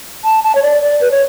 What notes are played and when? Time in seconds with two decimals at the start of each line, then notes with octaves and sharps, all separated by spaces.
0.24 A5
0.44 A5
0.55 C#5
0.63 D5
0.82 D5
1.01 B4
1.11 C#5